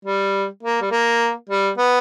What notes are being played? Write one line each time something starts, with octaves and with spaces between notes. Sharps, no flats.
G3
A#3
G3
A#3
G3
B3